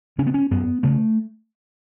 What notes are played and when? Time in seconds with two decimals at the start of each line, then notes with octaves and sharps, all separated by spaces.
0.18 C#3 C#4
0.27 B3
0.34 C#4
0.51 F#2 B3
0.83 C#3 A3